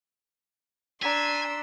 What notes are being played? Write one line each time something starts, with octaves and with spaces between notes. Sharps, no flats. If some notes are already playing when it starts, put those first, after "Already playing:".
D4 G#5 A#5 C6 E6 B6